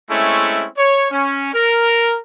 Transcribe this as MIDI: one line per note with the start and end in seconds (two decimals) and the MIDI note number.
0.10 0.66 56
0.10 0.66 57
0.10 0.66 60
0.10 0.66 61
0.10 0.66 64
0.77 1.08 73
1.12 1.50 61
1.53 2.18 70